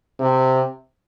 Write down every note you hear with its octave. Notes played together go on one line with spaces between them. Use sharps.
C3